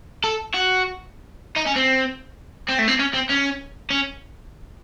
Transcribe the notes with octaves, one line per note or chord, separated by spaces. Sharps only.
A4
F#4
D#4
C#4
C4
C4
A3
C4
C#4
C4
C#4
C#4